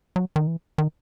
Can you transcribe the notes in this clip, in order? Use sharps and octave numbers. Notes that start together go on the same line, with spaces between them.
F#3
D#3
E3
D#3